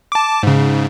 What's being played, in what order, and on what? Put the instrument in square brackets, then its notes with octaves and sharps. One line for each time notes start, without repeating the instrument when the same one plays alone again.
[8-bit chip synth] A5 D6
G#2 C#3